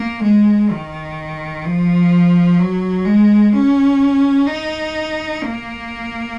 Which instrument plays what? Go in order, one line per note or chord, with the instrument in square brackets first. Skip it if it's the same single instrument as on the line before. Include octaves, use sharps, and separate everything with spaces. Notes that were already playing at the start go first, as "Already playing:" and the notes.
Already playing: [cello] A#3
G#3
D#3
F3
F#3
G#3
C#4
D#4
A#3